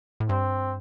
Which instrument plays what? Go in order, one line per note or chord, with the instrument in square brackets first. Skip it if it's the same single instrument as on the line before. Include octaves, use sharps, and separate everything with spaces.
[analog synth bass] A2
[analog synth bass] G2 [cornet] C4